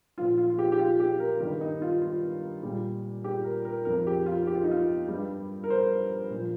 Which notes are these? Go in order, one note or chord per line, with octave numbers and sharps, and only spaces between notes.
A#2 F3 F4
F4
F4
G4
G4
F4
G4
A#4
G2 D#3 G3 A#4
D#4
F4
F4
A#2 G3
G4
A#4
A#4
F2 F3 A#4
G4
F4
G4
F4
D#4
F4
G2 G3
A#4
C5
A#2 F3